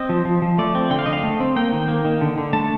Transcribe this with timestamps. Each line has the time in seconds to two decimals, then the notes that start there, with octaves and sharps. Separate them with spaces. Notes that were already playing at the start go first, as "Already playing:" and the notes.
Already playing: C4 D#5
0.09 F3
0.25 F3
0.42 F3
0.58 A3 D5
0.75 C4
0.90 D3 G5
0.99 F5
1.06 D3 D#5
1.13 F5
1.24 A3
1.40 C4
1.56 A#3 G5
1.72 D#3
1.88 A#3
2.05 D#3
2.21 D3
2.38 D3
2.53 A3 A5